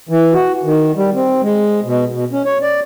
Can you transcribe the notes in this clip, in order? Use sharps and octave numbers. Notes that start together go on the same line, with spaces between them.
E3
F#4
D#3
G3
C4
G#3
B2
B2
C#4
C#5
D5